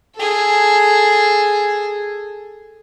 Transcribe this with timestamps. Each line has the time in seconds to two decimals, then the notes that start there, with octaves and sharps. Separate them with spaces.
0.16 G#4 A4